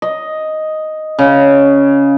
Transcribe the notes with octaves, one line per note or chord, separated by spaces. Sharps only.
D#5
C#3